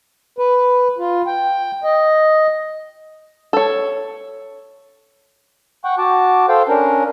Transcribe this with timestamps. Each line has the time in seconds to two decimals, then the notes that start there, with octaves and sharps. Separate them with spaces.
0.39 B4
0.98 F4
1.27 G5
1.84 D#5
3.53 A4 C#5
5.84 F#5 G5 C#6
5.98 F#4 A5 D6
6.49 A4 C5 F5 G5
6.68 C#4 D4 A#4